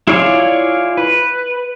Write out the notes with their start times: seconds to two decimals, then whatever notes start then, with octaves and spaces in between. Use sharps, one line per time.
0.07 E4 F4 G#4 C#5 D5
0.97 B4